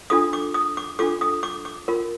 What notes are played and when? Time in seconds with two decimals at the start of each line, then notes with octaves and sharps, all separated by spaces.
0.10 D4 F4 A4 D#6
0.33 D6
0.54 D#6
0.77 D6
0.99 D4 F4 A4 D6
1.21 D#6
1.43 D6
1.65 D6
1.88 F4 A#4